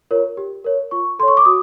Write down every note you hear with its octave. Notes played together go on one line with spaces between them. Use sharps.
F4 A#4 C#5
G4
A#4 C#5
F4 C#6
A4 C#5 C6
C#6
D6
F#4 D#6